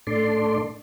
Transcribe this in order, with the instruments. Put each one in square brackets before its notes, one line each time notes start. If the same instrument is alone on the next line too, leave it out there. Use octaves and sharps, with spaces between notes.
[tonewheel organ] A2 D4 A4 D5 C6